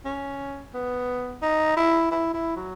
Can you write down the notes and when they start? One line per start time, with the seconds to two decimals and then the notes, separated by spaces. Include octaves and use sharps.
0.05 C#4
0.74 B3
1.43 D#4
1.77 E4
2.11 E4
2.34 E4
2.56 F#3